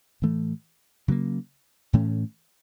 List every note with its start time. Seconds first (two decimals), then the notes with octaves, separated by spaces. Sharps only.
0.22 A2 E3 A3
1.08 C#3 F#3 A#3
1.93 A2 E3 A3 C#4